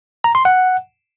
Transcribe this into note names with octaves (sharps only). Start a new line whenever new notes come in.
A#5
C6
F#5